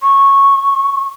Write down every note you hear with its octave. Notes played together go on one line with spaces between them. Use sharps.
C#6